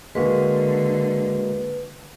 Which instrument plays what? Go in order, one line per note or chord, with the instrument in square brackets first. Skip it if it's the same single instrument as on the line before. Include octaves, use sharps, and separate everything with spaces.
[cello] D3 [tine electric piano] G#3 A#3 F#4 [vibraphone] B4